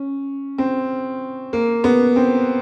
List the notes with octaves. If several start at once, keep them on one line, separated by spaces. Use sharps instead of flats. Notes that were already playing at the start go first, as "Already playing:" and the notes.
Already playing: C#4
C4
A#3
B3
C4